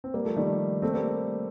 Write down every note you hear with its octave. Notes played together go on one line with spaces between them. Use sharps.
C4
G3 A#3
F3 A3
D#3 G3
A3 C4
G3 A#3